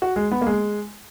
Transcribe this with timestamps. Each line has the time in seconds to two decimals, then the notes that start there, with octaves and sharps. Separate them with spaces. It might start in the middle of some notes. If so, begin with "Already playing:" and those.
0.02 F#4
0.16 G#3
0.31 B3
0.42 A#3
0.46 G#3